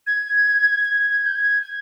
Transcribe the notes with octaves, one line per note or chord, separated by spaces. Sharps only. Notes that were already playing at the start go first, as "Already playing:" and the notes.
G#6
G#6
G#6
G6
G#6
G#6